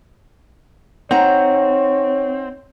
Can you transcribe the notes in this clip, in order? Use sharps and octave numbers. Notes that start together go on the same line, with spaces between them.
C4 D#4 C#5 F#5 A#5